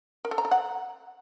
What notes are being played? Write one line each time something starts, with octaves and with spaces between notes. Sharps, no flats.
A#4
A4
A#5
A4
F#5